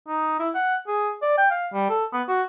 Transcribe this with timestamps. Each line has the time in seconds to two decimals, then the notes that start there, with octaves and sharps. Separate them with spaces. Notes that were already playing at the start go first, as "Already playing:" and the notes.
0.08 D#4
0.40 E4
0.54 F#5
0.87 G#4
1.22 D5
1.38 G5
1.51 F5
1.73 G3
1.89 A4
2.13 B3
2.28 F#4